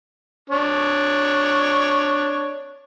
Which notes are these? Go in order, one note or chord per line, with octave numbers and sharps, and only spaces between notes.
D4 C#5